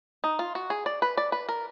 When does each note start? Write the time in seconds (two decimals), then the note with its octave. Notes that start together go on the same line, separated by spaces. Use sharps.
0.24 D#4
0.39 F4
0.55 F#4
0.70 G#4
0.86 D5
1.02 B4
1.17 D5
1.32 B4
1.49 A#4